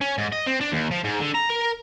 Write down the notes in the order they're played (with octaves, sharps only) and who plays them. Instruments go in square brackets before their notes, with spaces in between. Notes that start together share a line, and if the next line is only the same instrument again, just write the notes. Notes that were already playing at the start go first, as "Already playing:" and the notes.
[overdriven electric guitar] C#4
G#2
D#5
C4
D4
D#2
F3
G#2
D3
A#5
A#4